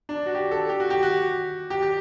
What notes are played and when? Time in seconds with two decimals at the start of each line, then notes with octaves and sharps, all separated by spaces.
0.09 D4
0.26 F#4
0.35 G4
0.52 A4
0.69 G4
0.80 F#4
0.90 G4
1.03 F#4
1.70 G4
1.82 G4